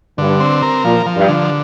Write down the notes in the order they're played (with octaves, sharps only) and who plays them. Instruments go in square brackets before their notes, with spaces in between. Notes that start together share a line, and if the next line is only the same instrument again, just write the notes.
[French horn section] G2 [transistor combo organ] D3
[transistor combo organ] C4
A#4
[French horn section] A#2 [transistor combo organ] F3
[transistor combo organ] F3
[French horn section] G2
[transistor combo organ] D3